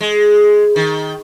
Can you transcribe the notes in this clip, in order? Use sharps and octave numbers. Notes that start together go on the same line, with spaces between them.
G#3
D#3